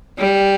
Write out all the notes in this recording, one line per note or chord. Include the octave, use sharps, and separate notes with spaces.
G3